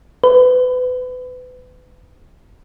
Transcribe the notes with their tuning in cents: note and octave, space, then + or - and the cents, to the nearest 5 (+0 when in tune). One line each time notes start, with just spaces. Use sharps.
B4 +30